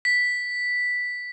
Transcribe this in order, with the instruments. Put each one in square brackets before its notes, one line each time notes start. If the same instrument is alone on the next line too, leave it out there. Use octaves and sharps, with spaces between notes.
[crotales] B6